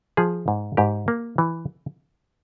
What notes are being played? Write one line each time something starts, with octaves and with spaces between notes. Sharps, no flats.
F3 G#4
G#2
G#2 G4
A#3
E3